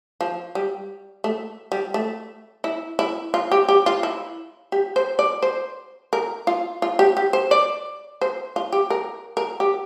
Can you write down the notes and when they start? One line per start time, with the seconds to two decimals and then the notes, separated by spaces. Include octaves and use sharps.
0.21 F3
0.55 G3
1.24 A3
1.72 G3
1.94 A3
2.64 E4
2.99 E4
3.34 F4
3.52 G4
3.69 G4
3.86 F4
4.03 E4
4.72 G4
4.96 C5
5.19 D5
5.43 C5
6.13 A#4
6.47 F4
6.82 F4
6.99 G4
7.17 G4
7.33 C5
7.51 D5
8.21 C5
8.56 F4
8.73 G4
8.90 A#4
9.37 A#4
9.60 G4